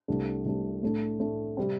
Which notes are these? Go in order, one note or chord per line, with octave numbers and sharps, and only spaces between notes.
C2 C3 A3 D4
C2 C3 A3 D4
A2 A3 D4
A2 A3 D4
C3 G3 C4